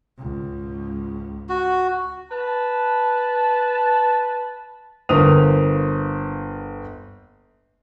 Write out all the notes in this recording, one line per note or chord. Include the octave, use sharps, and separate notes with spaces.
C#2 G#2
F#4
B4 A5
G1 A#3 C5 D#6 F7